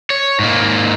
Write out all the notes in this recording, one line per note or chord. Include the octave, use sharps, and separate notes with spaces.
C#5
G#2 A#3